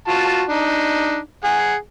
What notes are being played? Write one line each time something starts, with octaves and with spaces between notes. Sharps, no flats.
F4 F#4 A5
D4 D#4
G#4 F#5